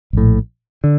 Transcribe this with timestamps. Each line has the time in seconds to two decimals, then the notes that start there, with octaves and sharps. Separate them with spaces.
0.13 A#1 A2
0.84 D3